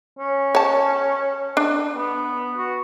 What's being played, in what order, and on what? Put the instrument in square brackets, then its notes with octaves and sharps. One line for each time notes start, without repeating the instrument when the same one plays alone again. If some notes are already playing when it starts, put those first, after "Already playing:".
[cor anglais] C#4
[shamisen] C#5 A5
D4
[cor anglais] B3
F#4